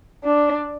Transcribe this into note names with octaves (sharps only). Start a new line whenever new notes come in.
D4